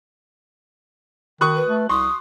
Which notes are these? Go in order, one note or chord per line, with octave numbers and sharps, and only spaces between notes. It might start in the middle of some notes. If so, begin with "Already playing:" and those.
D#3 F#4 C#6 D#6 F#6
B4
A3
C2 C6 C#6 D#6